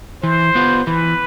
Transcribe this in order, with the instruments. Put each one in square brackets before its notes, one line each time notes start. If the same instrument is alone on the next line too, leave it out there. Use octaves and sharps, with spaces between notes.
[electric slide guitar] E3 [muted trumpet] C5
[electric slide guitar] B3 F4 B4
[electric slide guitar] E3 [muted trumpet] B4